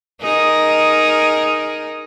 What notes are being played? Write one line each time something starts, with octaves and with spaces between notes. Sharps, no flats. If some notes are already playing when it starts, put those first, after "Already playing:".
D#4 G#4 A#4